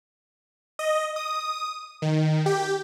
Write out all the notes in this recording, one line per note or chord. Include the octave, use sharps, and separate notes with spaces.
D#5
D#6
D#3
G4